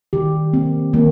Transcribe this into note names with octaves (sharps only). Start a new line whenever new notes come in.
D#3 G4
A#3 C4
D#3 A#3